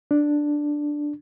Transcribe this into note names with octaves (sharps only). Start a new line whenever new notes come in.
D4